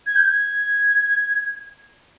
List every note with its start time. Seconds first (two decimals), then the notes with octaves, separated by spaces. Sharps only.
0.07 G#6
0.16 G6
0.24 G#6